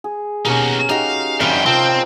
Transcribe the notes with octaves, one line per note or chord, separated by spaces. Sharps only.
G#4
D#2 B2 C#4 D#4 F#4 G4 A#4
D#4 F#4 G4 F5 G#5
F#2 D#3 G3 C4 F5 G5
C3 F3 C4 A#4